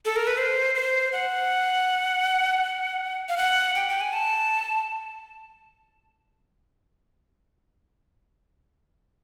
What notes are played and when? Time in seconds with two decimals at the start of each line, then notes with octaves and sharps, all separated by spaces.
0.05 A4
0.16 A#4
0.27 B4
0.38 C5
0.75 C5
1.12 F#5
3.29 F5
3.37 F#5
3.75 G5
3.89 G5
4.01 G#5
4.13 A5